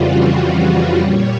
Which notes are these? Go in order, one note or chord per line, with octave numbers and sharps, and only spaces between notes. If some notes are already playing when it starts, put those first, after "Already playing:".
Already playing: F2 C#3 E3 G3 F4 F#4
F#4
A#2 G3 C#5